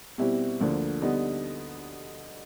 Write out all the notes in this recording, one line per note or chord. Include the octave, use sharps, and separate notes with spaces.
B2 G3 C4 E4 G4
D2 D3 F3 A#3
D3 G3 B3 D#4